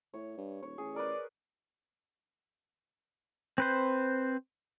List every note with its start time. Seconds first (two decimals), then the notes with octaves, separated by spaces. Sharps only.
0.14 A2 C#5
0.38 G2
0.63 D#1 C#5
0.78 A1 G#4
0.96 A#4 B4 D5
3.58 C4 B4 C5